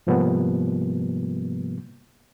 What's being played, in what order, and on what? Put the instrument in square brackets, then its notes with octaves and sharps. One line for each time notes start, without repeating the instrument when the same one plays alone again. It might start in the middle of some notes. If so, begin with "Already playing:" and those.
[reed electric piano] G#2 C3 F3 G3 A#3 B3